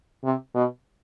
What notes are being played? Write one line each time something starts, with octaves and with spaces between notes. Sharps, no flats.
C3
B2